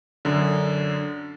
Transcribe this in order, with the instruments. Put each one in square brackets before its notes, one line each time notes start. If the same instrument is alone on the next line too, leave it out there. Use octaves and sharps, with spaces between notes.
[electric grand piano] F#2 D3